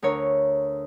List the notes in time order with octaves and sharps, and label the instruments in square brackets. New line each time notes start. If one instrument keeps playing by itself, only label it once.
[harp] D2 A#4 C#5